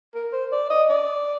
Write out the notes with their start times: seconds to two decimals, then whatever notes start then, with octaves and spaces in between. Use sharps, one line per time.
0.15 A#4
0.33 C5
0.52 D5
0.70 D#5
0.90 D5